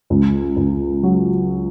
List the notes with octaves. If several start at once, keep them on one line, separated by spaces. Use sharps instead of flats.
C#2
C#2
F#3